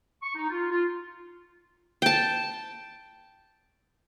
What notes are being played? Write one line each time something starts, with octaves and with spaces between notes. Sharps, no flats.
C#6
D#4
F4
F4
G5 A5